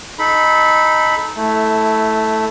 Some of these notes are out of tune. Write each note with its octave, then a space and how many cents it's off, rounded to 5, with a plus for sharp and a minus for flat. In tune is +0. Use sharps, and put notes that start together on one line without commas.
D#4 +0 A4 -25 B5 +0
A3 +0 E4 -20